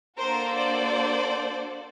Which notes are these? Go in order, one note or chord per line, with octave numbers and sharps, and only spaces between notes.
A#3 D4 F#4 A4 A#4 C5
C5 D5